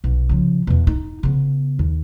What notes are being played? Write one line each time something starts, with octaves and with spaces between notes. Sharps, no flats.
B1
C#3 F3
E2 B2
D#4
C#3 B3
D#2